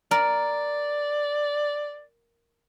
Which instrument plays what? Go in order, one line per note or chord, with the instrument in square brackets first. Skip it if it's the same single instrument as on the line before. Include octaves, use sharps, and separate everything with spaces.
[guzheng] A#4 [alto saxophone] D5